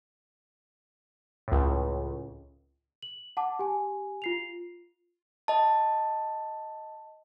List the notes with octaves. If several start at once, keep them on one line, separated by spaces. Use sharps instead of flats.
C#2 A2
F#7
F#5 A5 D6
G4 G#5
F4 C7 F7
D#5 A5